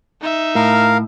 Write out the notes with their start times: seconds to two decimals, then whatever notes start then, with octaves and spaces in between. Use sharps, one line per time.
0.21 D#4 E5
0.55 A2 A#4 F5